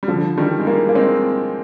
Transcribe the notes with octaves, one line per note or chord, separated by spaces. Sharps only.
G3
D3 F3
D#3 G3
G#3
G3 A#3
A#3
G#3 C4